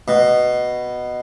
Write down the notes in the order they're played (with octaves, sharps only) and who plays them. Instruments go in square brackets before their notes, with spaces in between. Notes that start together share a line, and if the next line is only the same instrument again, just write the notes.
[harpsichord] B2